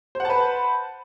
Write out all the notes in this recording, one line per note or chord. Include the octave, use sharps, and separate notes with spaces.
B4 C5 F#5 A5